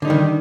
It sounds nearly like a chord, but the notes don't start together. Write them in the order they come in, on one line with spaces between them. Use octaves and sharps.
D3 D#4 G3 D#3